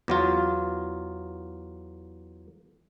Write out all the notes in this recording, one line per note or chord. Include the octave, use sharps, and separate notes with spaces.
E2 F#3 F4